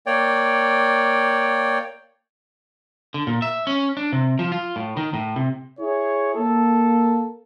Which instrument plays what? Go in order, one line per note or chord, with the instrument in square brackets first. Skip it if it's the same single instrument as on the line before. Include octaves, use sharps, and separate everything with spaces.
[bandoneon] A#3 C#5 D5 G5
[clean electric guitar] D3
A#2
E5
C#4
D4
C3
F3
F4
A2
D#3
A2
C3
[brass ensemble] E4 G#4 C#5
A#3 A4